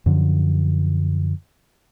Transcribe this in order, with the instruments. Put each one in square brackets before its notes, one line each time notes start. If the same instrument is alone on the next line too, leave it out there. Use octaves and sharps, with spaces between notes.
[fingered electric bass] F#2 D3 F3